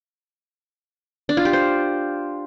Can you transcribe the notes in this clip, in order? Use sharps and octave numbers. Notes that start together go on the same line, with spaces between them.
D4
F4
G4
C5